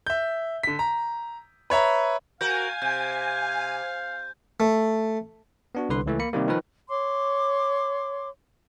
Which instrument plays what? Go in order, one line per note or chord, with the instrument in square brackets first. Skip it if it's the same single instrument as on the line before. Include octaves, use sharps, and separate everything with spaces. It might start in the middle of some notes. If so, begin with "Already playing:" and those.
[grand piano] E5 G6
D3 B6
A#5
B4 C#5 E5 A#5
[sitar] F#4 A#4 [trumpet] F5 [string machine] G#5 [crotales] G6
[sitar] C3 [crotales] G6
[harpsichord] A3
[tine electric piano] B3 D4 F#4
C2 D3 B4 C6
C#2 E3 A3
A#3 B5 C#7
C3 D#3 G3 A#3
D#3 F3 B4
[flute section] C#5 C6 D6